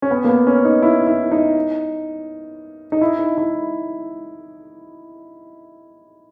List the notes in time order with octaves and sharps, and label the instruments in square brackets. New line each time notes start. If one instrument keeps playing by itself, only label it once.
[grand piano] C#4
B3
A#3
B3
C#4
D#4
E4
E4
D#4
D#4
E4
D#4
E4